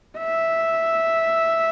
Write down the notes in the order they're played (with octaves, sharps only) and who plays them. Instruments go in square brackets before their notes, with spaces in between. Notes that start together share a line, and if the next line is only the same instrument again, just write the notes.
[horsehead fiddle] E5